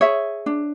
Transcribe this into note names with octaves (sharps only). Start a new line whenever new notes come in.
G#4 C#5 E5
D4